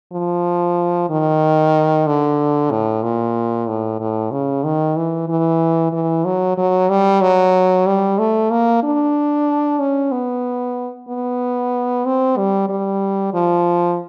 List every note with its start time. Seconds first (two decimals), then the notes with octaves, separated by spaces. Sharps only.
0.13 F3
1.10 D#3
2.07 D3
2.71 A2
3.03 A#2
3.67 A2
4.00 A2
4.31 C#3
4.64 D#3
4.97 E3
5.28 E3
5.93 E3
6.25 F#3
6.57 F#3
6.90 G3
7.21 F#3
7.87 G3
8.19 A3
8.51 A#3
8.83 D4
9.80 C#4
10.12 B3
11.08 B3
12.06 C4
12.37 G3
12.69 G3
13.34 F3